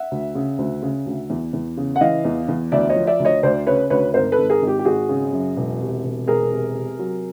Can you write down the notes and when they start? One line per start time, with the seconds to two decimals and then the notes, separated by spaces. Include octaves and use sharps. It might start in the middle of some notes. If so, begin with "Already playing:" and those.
Already playing: E5 F#5
0.11 D2
0.35 C#3
0.58 D2
0.82 C#3
1.06 D2
1.30 E2
1.53 E2
1.77 C#3
1.96 F#5
2.01 E3 D#5 F5
2.25 E2
2.48 E2
2.72 D2 D5 E5
2.89 C#5 D#5
2.96 F3
3.07 D5 E5
3.19 D2
3.25 C#5 D#5
3.43 D2 C5 D5
3.67 C#3 B4 C#5
3.90 D2 B4 C#5
4.14 G#1 A#4 C5
4.32 A4 B4
4.38 G#1
4.50 G#4 A#4
4.62 G#1
4.67 G4
4.79 G4
4.85 G#1 F#4 G#4
5.09 C#3
5.32 F#2
5.56 E1
5.80 C3
6.04 E1
6.27 E1 G#4 A#4
6.51 C3
6.75 C3
6.99 F#3